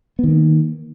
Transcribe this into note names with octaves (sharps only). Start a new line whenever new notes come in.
D#3 A#3 B3